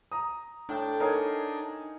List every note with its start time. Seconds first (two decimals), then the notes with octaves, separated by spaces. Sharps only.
0.12 A#5 D#6
0.69 A2 D4 G5
1.00 D#4 G#4 A#4 C#5 G#5